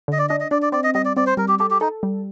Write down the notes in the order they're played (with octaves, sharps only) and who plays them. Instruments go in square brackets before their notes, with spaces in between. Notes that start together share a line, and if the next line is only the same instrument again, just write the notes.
[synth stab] D3 [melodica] D#5
[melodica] D5
[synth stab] D4 [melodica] D#5
[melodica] D#5
[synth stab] D4 [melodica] D5
[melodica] D5
[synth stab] C4 [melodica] D5
[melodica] D#5
[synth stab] G3 [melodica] D#5
[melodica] D5
[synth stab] C4 [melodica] D5
[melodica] C5
[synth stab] G3 [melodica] A#4
[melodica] G4
[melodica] G4 [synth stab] A4
[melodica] G4
[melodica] D#4 [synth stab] A4
[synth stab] G3